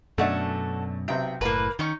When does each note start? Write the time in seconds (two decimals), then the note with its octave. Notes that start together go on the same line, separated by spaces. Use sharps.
0.18 F#2 B2 A3 C#4 D4 F#4 A4
1.08 B1 C3 G5
1.41 F#1 A2 A#3 B4 A#5
1.79 D#3 C#4 D#4 C#6